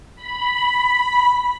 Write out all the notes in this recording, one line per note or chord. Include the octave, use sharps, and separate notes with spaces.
B5